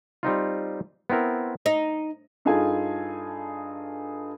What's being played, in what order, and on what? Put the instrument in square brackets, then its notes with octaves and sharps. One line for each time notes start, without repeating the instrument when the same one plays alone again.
[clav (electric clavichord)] G3 C4 D#4 F4
B3 C4 E4 A#4
[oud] D#4
[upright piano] G2 D#4 F4 G#4 A4 G#5